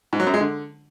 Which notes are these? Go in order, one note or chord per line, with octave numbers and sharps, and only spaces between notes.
G#2
F#3
F#2
G#3
D3